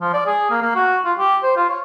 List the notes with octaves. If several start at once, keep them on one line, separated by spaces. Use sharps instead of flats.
F3
D5
G#4
A#3
A#3
F#4
F4
G4
C5
F4
C#5